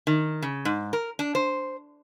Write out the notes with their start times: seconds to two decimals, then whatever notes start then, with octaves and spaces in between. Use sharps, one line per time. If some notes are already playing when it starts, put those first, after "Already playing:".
0.07 D#3
0.42 C#3
0.65 G#2
0.93 A#4
1.19 D4
1.35 C5